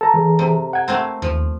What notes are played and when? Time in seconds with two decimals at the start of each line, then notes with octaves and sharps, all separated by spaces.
0.01 A4 A5 A#5
0.14 E3 G#4
0.39 C3
0.73 F#5 G#6
0.88 A3 A#3 C4
1.22 D#2 F3